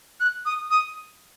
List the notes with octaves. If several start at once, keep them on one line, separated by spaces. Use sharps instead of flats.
F#6
D#6
D#6